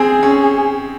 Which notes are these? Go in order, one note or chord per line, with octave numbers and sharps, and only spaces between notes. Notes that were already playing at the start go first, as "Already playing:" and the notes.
Already playing: C4 G#4
C#4